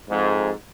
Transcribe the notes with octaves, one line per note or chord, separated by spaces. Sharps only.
F2 G#2